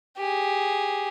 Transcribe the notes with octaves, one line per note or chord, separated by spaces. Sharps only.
G4 G#4